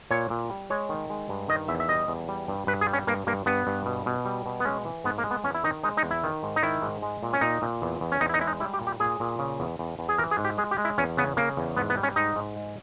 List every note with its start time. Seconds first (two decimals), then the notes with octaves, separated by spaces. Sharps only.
0.11 A#2 C#5
0.30 A#2
0.50 G3
0.70 G#3 C#5
0.89 D#3
1.10 G#3
1.29 G2
1.48 D#3 D#5
1.68 E2 E5
1.80 E5
1.89 G3 D#5
2.08 E2
2.28 G3
2.48 G2
2.67 G2 B4
2.81 G#4
2.87 G3
2.93 C#4
3.07 G2 A#3
3.27 G2 A#3
3.46 G2 B3
3.67 G2
3.86 B2
4.06 B2
4.25 G3
4.46 B2
4.60 B3
4.65 G#3 C#4
4.85 E3
5.04 G#2 B3
5.18 A#3
5.24 G#3
5.31 B3
5.44 E2 C#4
5.55 E4
5.63 D#3 D#4
5.84 G#3 D#4
5.97 D#4
6.03 E2
6.11 E4
6.23 D#3
6.43 G#2
6.56 D#4
6.63 D#3 E4
6.82 G#2
7.02 G#3
7.23 A#2
7.33 C#4
7.41 A#2 D#4
7.62 A#2
7.82 E2
8.01 E2
8.12 C#4
8.21 E2 D#4
8.29 E4
8.34 D#4
8.41 G#3 E4
8.47 D#4
8.60 G3 E4
8.74 G4
8.81 A#2
8.87 G4
9.00 A#2 G#4
9.20 A#2
9.39 C#3
9.60 E2
9.79 E2
9.99 E2
10.09 G#4
10.18 E3 A#4
10.31 G#4
10.38 G#2
10.45 G4
10.58 G#3 G#4
10.71 G4
10.78 G#3
10.85 E4
10.98 E2 C#4
11.17 C#3 B3
11.37 C#3 A#3
11.57 E2
11.77 G#2 B3
11.90 B3
11.97 G3
12.03 C#4
12.16 G#2 D#4
12.36 G#2
12.56 G#3